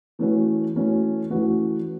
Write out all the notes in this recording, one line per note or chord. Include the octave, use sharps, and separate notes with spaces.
E3 A3 C#4 F#4 B4
E3 A3 C#4 F#4 B4
E3 A3 C#4 F#4 B4